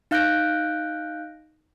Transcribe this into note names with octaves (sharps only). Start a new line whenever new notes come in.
D#4 F5 F#6 G6 A#6 D7